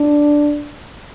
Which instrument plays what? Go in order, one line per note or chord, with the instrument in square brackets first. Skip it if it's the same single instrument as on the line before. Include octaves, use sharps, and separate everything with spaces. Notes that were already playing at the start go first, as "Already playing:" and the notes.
Already playing: [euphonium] D4